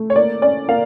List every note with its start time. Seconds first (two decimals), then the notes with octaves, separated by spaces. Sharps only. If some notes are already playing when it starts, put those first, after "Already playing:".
Already playing: A3
0.10 C#5
0.16 A#3 D5
0.42 C#4 D5
0.69 A#3 F5